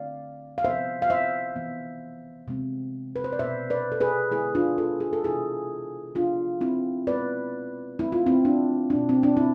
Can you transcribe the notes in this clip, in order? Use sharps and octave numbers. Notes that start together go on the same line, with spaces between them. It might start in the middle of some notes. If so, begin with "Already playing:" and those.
Already playing: D3 A3 C4 D5 F5
F5
C3 F3 B3 C5 E5
F5
C5 E5
E3 B3
C3 G#3 C4
B4
C5
D5
B2 B3 C5 E5
B4 D5
A4
G#4 B4
D3 G#3 B3 E4 G#4
D4 F4
F4 A4
G#4
A4
C3 E3 B3 E4 G#4
C3 F3 B3 D4 F4
C4 E4
B2 G#3 B3 B4 D5
E3 A3 C4 E4
F4
C4 E4
D4
B2 B3 D4
C4
D4
C4 E4